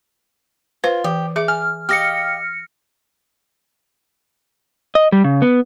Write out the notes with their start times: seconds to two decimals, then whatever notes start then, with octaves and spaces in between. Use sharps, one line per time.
0.84 F4 B4 C5
1.04 E3 G4
1.36 G#4 E5 D6
1.48 G#5 F6
1.89 G4 D#5 F5 F6 A#6 C#7
4.95 D#5
5.12 G3
5.24 C#3
5.42 B3